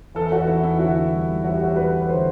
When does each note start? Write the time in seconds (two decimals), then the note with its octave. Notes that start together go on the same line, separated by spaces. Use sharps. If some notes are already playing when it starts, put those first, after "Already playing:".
0.15 E2 A4
0.32 F#4
0.47 E2 E4
0.63 E4
0.79 D3 F#4
1.13 G3
1.44 E2 F#4
1.54 G4
1.64 F#4
1.76 E2 B4
2.01 B4
2.09 D3 C5